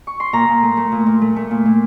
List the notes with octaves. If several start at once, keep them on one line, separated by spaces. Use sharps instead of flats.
C#6
C6
A#2 A#5
A#2
A3
A3
A#2
A#2
A3
A3
A#2
A#3